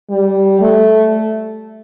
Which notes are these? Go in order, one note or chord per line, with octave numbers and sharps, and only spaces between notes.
G3
A3